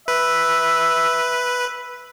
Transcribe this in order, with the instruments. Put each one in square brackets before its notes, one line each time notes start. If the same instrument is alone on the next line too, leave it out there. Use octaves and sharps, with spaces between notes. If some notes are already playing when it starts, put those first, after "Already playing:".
[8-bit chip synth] B4 [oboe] E5